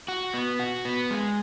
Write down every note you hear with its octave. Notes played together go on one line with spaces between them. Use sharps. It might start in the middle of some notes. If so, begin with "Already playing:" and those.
F#4
B3
F#4
B3
G#3